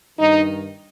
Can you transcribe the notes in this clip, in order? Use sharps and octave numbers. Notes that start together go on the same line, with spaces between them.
G2 D#3 D#4